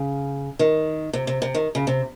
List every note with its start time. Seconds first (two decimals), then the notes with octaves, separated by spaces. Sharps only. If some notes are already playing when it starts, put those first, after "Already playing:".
Already playing: C#3
0.59 D#3
1.13 C3
1.27 C3
1.42 C3
1.54 D#3
1.75 C#3
1.87 C3